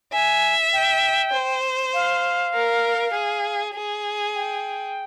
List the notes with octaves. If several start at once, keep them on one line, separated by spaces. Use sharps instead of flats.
E5 G#5
G5
C5
F5
A#4
G#4
G#4
G5